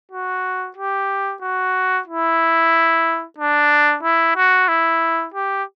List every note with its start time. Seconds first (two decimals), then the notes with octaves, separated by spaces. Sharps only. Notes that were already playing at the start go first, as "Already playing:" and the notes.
0.12 F#4
0.77 G4
1.42 F#4
2.08 E4
3.38 D4
4.03 E4
4.36 F#4
4.68 E4
5.34 G4